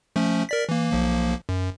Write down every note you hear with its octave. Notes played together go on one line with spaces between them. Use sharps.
F3 A3 C#4
A#4 D5 B6
E3 A#3
B1 F3 A#3
F#2